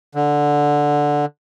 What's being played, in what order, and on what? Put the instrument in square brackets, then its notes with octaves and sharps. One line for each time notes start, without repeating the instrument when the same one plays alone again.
[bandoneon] D3